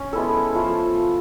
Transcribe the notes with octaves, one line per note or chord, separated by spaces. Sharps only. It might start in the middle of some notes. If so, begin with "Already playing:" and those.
Already playing: C#4
G#3 B3 E4 A4
F3 A3